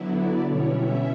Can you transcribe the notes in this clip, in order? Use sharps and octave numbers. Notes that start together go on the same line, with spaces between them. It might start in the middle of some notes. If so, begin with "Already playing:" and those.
Already playing: D3 F#3 B3 E4
D5
B2 G3 C#4 E4 C#5
E5